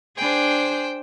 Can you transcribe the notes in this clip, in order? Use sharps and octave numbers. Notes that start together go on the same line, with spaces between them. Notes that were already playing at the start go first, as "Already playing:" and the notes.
D4 G#4 C5 G5